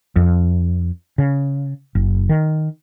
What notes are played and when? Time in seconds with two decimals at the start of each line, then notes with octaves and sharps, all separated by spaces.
0.16 F2
1.18 C#3
1.95 F#1
2.29 D#3